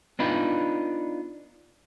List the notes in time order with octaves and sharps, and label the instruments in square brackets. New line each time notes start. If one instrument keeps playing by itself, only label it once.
[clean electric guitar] B3 D4 D#4 F4 B4